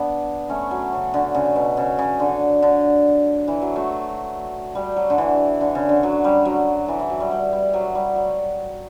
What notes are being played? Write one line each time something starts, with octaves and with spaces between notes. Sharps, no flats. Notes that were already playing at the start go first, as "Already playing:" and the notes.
Already playing: B3 D4
A3 C#4
F#3
C#3
D3
C#3
B2
C#3
C#3
D3
D3
E3
F#3
F#3 A3
G3
F#3
D3
E3
D3
C#3
D3
F#3
G3
F#3
E3
E3
F#3
G3
G3
G3
F#3
G3
F#3